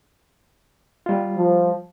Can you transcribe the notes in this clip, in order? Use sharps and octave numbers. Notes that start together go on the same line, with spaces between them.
G3 F4
F3